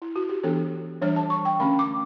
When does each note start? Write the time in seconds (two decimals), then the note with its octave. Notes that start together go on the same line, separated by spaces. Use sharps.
0.02 E4
0.16 F#4
0.29 G4
0.43 E3 B3 D4 A4
1.02 E3 G3 D4 C#5
1.16 A5
1.30 C#6
1.45 G5
1.60 D3 A3 C#4 B5
1.79 D6